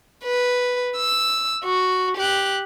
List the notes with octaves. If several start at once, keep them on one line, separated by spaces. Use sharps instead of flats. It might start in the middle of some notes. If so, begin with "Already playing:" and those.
B4
E6
F#4
G4 F#6